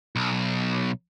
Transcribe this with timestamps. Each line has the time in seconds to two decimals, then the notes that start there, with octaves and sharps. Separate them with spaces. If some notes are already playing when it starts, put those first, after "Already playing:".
0.16 B1